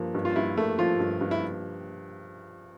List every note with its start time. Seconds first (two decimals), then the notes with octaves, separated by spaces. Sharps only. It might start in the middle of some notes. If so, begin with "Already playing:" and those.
Already playing: G2 F3 A#3
0.15 G2
0.25 F4
0.36 G2 E4
0.57 A3 A#3
0.79 F3 F4
1.00 G2
1.21 G2
1.31 E4